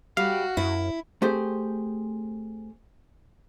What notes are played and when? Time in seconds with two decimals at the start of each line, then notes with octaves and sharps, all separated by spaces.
0.17 G3 F#4 G4 F5
0.57 F#2 E4
1.22 A3 C4 G4 G#4 C5